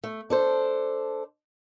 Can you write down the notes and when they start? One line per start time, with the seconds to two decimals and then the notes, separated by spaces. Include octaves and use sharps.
0.04 A3
0.30 D4 A4 C5